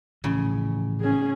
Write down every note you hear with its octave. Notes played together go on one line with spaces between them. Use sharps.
A2 C#3 E3 F3
C#4 G#4